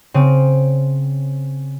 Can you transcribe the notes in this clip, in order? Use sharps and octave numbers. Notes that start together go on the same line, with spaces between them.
C#3 C4 D#7